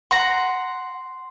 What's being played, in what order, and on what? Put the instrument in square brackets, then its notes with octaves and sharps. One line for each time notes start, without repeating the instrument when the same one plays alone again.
[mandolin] F#5 A#5 [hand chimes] C6